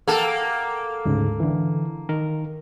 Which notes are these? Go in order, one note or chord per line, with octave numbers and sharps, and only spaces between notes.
A#3 A4 F#5 G5
D2 G#2 C#3
D3 E3
D#3 A#4